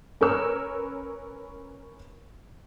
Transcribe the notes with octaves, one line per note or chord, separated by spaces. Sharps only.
C#4 A#4 B4 C#5 E6 F6